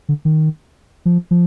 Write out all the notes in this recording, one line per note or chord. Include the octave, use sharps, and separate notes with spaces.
D3
D#3
F3
F3